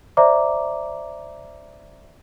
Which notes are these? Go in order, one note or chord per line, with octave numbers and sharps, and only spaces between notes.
C5 D5 E5 A#5 D6